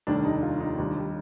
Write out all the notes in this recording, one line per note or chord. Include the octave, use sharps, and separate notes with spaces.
F1 D#2 D#3 G3 D4
D#4
F4
D#4
D#2 D#3 G3 D4
G3